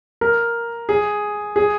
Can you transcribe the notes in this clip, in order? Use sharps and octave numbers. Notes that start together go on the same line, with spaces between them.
A#4
G#4
G#4